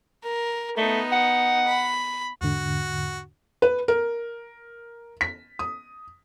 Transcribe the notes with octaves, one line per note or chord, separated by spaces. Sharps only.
A#4
A3 B3 D#4
F#5
B5
E2 G#2 D3 F#4
B4
A#4
B6
D#6